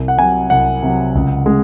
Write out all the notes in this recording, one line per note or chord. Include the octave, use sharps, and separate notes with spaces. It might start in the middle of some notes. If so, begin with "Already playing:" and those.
Already playing: C2
F#5
C3 F#3 G#5
C2 F#5
C3 F#3
C#2
C#3 G#3